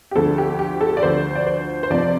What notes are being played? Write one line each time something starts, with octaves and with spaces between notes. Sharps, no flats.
G4
D2 D3 F3 A4
G4
G4
A4
D5
D2 D3 F3 C5
D5
C5
C5
F2 C3 F3 D5